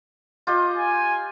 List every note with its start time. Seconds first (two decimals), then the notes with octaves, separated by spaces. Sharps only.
0.47 F4 G4 D#5
0.77 G#5